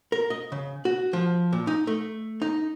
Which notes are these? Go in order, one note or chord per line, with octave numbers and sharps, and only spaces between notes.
A#4
D#5
C#3
F#4
F3
A#2
D#4
A3
D#4